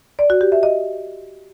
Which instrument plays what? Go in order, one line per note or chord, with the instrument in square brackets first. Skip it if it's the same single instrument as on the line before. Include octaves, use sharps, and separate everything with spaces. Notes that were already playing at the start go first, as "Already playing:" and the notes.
[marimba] D5
F#4
G4
E5
D#5